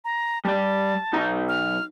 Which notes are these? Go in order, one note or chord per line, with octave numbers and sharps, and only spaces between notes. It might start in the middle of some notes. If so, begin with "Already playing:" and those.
A#5
G3 D5 A5
B1 D#4 A#5
F6